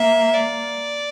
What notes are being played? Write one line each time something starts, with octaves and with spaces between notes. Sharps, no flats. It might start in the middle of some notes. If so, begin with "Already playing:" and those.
Already playing: A#3 E5
D5